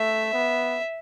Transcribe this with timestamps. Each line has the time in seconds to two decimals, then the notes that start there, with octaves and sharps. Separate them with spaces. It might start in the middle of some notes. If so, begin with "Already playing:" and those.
Already playing: A3 E5
0.34 B3